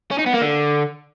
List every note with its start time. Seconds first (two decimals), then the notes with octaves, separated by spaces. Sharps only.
0.11 C#4
0.19 D#4
0.26 B3
0.34 A#3
0.42 D3